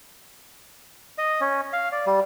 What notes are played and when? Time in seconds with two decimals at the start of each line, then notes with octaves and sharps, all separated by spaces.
1.18 D#5
1.41 C#4
1.73 F5
1.92 D5
2.06 G3